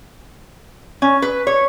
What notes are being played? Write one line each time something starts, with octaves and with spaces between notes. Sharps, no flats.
C#4
B4
C#5